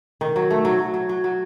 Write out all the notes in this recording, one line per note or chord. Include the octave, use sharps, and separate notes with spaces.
D#3
F#3
A3
F#3
F#3
F#3
F#3
F#3